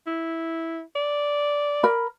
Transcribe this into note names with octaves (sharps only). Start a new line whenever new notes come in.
E4
D5
A#4 B5